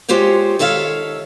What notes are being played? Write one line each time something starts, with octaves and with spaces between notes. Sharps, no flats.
G#3 F4 G4 C5 C#5
D#3 A4 C#5 E5 F5